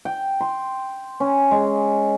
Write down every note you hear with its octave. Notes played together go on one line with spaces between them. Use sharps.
G5
C6
C#4
G#3